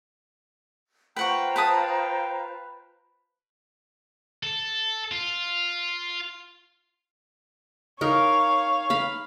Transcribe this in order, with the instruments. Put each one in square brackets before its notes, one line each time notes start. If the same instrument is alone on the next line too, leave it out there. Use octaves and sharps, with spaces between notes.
[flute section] F4 C5 A#5 [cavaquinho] B4 F#5 C#6 [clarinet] G5
[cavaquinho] B4 A5 D#6 [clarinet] G5
[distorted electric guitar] A4
F4
[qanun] D#4 A#4 [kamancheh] C#5 F5
[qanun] F5 B5